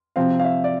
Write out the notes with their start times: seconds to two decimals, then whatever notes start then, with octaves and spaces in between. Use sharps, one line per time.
0.16 C3 F3 C4 F5
0.40 F5
0.45 E5
0.64 D5